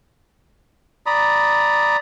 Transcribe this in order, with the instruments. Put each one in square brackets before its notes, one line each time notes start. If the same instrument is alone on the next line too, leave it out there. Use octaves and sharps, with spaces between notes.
[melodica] D5 A#5 B5 D#6